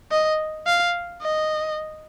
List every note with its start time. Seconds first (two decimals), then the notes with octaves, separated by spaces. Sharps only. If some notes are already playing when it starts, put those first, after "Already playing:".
0.11 D#5
0.67 F5
1.22 D#5